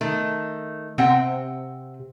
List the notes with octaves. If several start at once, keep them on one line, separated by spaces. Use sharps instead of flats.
D#3 A3
C3 C4 F#5 G5